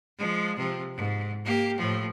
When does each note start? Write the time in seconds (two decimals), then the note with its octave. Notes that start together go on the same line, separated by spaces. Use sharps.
0.19 F3 G#3
0.57 C3 F3
0.95 G#2
1.45 A#3 G4
1.78 A2 F3